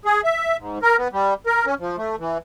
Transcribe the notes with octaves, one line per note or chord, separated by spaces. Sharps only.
G#4
E5
G#2
A#4
B3
G3
A#4
C#4
F3
A3
E3